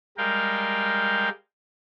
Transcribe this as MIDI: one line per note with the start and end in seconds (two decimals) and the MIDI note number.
0.18 1.29 55
0.18 1.29 56
0.18 1.29 70
0.18 1.29 77
0.18 1.29 79